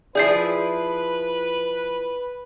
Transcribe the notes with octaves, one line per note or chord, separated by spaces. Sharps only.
F3 E4 G#4 B4 D5 G6 C7